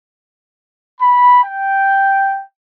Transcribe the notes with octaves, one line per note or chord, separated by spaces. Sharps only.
B5
G5